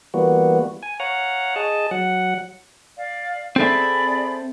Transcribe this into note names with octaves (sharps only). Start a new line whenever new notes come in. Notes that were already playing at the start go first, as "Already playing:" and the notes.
E3 G3 A#3 B3 F#4
G#5
C#5 F5 F#5 A#5
G#4 D#5 A5
F#3 F#5
D5 F5
C4 G#4 A4 D5 E5 B5